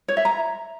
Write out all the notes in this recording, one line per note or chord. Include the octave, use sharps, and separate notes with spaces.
C#5
E5
A#5